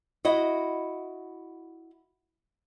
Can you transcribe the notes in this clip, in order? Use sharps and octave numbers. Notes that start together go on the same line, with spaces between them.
E4 F#4 D#5